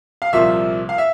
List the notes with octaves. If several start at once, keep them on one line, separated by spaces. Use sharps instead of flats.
F5
C2 A#2 F3 E5
F5
E5